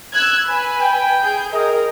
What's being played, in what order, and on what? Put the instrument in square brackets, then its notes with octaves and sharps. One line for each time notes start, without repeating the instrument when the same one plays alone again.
[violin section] E6 F#6 G#6
B4 G#5 B5
[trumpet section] G5
[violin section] G#4 G6
[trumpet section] G#4 D#5 [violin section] A#4